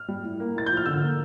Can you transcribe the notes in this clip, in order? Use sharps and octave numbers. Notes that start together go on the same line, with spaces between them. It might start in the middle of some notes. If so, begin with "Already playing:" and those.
Already playing: F6
G3
A2
A#3
A2 A6
F3 G6
F6
D3 E6
A#3